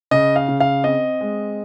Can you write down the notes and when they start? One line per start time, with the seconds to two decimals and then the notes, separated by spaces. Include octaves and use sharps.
0.11 C#3 D#5
0.36 F5
0.48 C#3
0.60 F5
0.84 C4 D#5
1.21 G#3